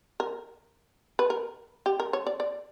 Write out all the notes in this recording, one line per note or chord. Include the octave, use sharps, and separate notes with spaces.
A#4
B4
A#4
G4
A#4
C#5
D5
D5